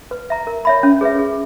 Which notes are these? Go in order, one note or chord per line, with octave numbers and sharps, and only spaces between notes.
B4
E5 A#5
A#4
C#5 E5 B5
C#4
G#4 B4 E5
G#4